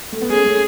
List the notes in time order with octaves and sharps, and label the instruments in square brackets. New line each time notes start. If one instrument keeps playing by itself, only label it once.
[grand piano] A3
B3
[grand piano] A3 C#4 [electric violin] G#4
[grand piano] A3 C#4